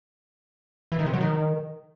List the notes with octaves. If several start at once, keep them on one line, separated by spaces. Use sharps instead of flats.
E3
D#3
C3
F#3
D#3